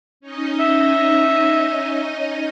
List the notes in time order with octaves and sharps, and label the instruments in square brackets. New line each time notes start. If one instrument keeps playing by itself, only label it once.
[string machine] C#4 D#4 D#5
[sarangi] E5